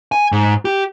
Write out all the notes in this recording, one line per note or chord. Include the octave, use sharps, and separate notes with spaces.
G#5
G#2
G4